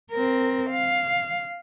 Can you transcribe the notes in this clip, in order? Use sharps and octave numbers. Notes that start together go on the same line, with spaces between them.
C4 A#4
F5